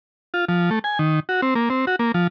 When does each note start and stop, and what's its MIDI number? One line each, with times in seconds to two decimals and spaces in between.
0.34 0.45 65
0.48 0.70 53
0.70 0.79 57
0.84 0.99 80
0.99 1.20 51
1.29 1.41 66
1.42 1.54 60
1.55 1.69 58
1.70 1.85 60
1.87 1.96 66
1.99 2.12 58
2.14 2.27 53